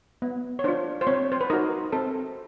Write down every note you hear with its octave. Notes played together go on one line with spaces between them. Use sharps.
B3
C#5
D4 F4 C5
C5
C4 C#5
C5
B4
D#4 F#4 A#4
C4 A4